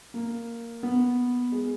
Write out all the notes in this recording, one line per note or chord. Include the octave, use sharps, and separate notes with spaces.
A#3
B3
G#3